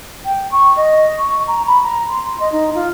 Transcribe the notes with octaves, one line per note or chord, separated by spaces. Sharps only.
G5
C#6
D#5
C#6
A#5
B5
A#5
C6
D#5
D#4
F4